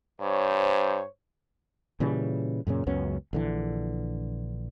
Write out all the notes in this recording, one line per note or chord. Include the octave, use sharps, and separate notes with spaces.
G2 C5 C#5
A#2 C#3 E3 G3
F#2 A#2 C#3 C#4
C#2 F#2 B3 C#4
A#1 D3 E3